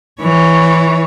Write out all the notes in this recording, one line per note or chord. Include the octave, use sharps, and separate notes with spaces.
E3 C#5